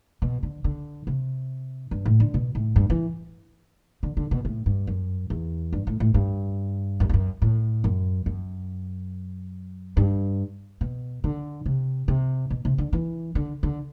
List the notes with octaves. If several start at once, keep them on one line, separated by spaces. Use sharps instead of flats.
B2
D3
D3
C3
G2
A2
D3
B2
A2
G2
E3
D3
D3
B2
A2
G2
F#2
E2
G2
A2
A2
G2
F#2
E2
F#2
A2
F#2
F#2
G2
B2
D3
C3
C3
B2
C3
D3
E3
D3
D3